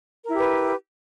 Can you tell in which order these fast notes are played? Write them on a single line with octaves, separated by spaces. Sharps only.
A#4 E4 G4 B4